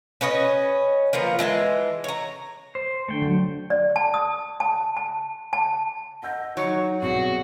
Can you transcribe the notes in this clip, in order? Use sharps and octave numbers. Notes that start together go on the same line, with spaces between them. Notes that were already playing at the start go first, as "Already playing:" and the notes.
C#4 B4 C#5 D#5
F3 A#3 B3 F4
E3 G#3 E5 A5
C#5 A#5
C5
D3 A3 G5
F#3
D5
A5
D#6
A5
A5
A5
D#5 F#5 E6 G6
F#3 D#4 C#5
C2 B2 F#4 G#4